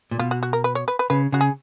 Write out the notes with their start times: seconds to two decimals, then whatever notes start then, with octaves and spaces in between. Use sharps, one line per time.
0.11 A#2
0.19 B2 F4
0.31 F#4
0.43 F#4
0.53 A#4
0.64 B4
0.75 C#5
0.88 B4
0.99 B4
1.10 C#3 B4
1.32 C#3 F#4
1.41 G#4